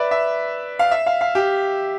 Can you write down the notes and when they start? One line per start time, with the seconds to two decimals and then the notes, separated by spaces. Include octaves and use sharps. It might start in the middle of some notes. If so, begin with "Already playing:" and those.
Already playing: B4 D5 E5
0.11 E5
0.79 F5
0.91 E5
1.06 F5
1.21 F5
1.35 G4